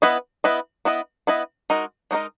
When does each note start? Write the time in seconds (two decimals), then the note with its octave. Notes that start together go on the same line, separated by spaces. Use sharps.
0.02 B3 E4 B4 D#5
0.44 B3 E4 B4 D#5
0.85 B3 E4 B4 D#5
1.27 B3 E4 B4 D#5
1.70 G#3 D#4 F#4 A#4 D#5
2.11 G#3 D#4 F#4 A#4 D#5